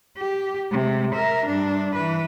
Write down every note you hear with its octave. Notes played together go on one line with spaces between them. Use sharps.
G4
C3 G#3
A#4 E5
G2 D4
E3 B4